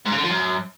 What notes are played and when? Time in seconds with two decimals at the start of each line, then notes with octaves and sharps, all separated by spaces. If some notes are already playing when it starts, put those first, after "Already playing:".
0.05 G#2
0.11 C#3
0.17 D3
0.23 F3
0.29 F#2